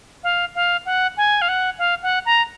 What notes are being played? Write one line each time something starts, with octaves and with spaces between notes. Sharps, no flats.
F5
F5
F#5
G#5
F5
F#5
F5
F#5
A#5